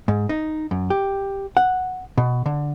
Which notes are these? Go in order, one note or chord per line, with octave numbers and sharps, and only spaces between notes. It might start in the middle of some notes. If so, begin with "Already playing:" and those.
G#2
D#4
F#2
G4
F#5
B2
D3